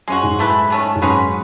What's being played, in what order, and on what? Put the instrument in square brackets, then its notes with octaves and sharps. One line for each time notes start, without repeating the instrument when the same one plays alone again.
[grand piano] F#2 [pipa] G#3 C#4 F#4
[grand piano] G#2
[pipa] E3 A3 E4 B4
D#3 A3 C#4
[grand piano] G#2
[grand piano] F#2 [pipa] G#3 C#4 F#4 B4